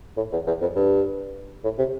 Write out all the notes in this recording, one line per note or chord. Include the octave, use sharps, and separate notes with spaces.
A2
E2
E2
F2
G2
A2
C3